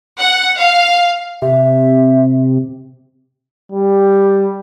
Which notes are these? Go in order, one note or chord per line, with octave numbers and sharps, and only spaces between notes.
F#5
F5
C3 E5
G3